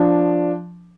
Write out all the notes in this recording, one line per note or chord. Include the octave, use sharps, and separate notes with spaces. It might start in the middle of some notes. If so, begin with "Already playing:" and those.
Already playing: F3 D4